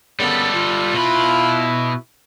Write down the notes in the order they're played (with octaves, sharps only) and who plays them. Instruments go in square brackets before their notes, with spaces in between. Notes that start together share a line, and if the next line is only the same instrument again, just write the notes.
[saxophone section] C#3 A#3 B3 [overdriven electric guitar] G3 A4
[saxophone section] F4
[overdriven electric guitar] B2 B5 [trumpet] E4